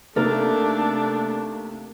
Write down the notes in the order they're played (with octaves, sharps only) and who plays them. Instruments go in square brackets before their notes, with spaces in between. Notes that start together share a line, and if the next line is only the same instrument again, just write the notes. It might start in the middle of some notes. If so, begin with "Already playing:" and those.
[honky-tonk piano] C3 A#3 D#4 [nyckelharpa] A3 [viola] D4 [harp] A4 A#4